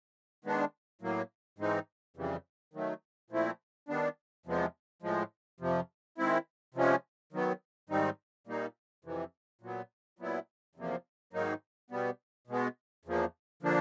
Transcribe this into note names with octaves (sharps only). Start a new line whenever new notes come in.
D#3 G#3 B3 D4
A2 F#3 A#3
G#2 E3 G#3 C4 D#4
F2 C#3 E3 G3
D#3 F#3 A3
A#2 F3 A3 C4 E4
D#3 G3 B3 D4
E2 C3 F3 G#3 B3
A2 F3 G#3
F2 C3 F3
D#3 G#3 C4 E4
C3 F3 G#3 C#4
D#3 F#3 B3
G#2 D#3 G3 C4 D#4
A#2 G3 A#3 D#4
F2 C3 E3
A#2 F#3 B3
A#2 F#3 B3 E4
E2 C3 F3 A#3
G#2 D#3 F#3 A#3 D#4
B2 G3 B3
B2 G#3 B3
E2 C#3 F3 A#3
D3 F3 A#3 D4